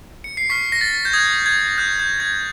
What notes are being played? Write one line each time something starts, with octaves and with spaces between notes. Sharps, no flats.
C#7
C7
C#6 F6 B6
A#6
A6
G6
D#6 F#6 G#6
G#6
D#6 F#6 G6
G6
G#6